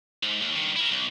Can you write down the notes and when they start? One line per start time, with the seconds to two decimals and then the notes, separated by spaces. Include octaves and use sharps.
0.23 G#2
0.42 D#2
0.56 G2 D#3
0.76 E4 A#4
0.91 B1